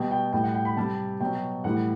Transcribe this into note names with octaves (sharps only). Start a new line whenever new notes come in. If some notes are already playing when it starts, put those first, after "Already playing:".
Already playing: B2 G3 G5
G5
A2 G3 G5
F#5
G5
B5
C3 G3 A5
B2 F#3 G5
A2 E3 G3 F#5